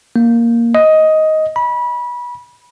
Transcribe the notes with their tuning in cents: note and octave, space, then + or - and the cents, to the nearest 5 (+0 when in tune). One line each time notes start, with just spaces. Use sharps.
A#3 +0
D#5 +10
B5 -25